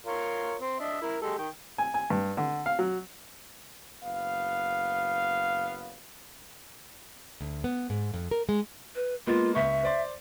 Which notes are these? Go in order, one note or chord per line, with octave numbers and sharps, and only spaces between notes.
F4 A#4 C#5
C4
D4 D#5 E5
E4 A#4
G#3 G4 A4
D#3 G5
G#5
G#5
G2
D3
F5
F#3
F#1 B3 F5
D2
B3
G#2
F2
A#4
G#3
B4
G#3 A#3 B3 F4
C#2 E5 C#6
C5 D5 C6